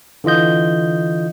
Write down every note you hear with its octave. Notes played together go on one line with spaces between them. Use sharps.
D3 E3 F4 D#5 G6